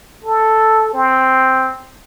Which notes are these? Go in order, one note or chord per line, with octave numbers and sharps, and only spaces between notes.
A4
C4